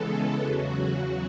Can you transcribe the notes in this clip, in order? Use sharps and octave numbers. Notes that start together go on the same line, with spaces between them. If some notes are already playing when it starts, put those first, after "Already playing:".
Already playing: C#3 E3 G#3 B3 A4
E2 C#3 F#3 F#4